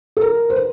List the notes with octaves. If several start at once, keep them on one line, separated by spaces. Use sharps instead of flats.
A4
A#4
C5
B4